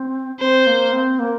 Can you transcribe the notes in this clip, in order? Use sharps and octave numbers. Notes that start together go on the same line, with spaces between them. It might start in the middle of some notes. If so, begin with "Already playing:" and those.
Already playing: C4
C4 C5
A#3
C4
A#3